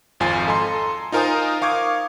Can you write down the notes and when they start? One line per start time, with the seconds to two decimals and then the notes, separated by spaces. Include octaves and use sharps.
0.20 G#1 F2 F4 G#5 C7
0.48 A4 D#5 G#5 A#5 C6
1.12 D#4 F4 A#4 C5 G#5 D#6
1.62 F5 C#6 D6 G#6